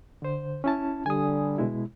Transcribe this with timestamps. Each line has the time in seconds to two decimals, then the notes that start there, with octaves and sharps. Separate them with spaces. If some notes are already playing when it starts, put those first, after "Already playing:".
0.22 D3 C5
0.64 C#4 E4 A5
1.06 D3 G3 G#5 D#6
1.58 B2 G#3 E4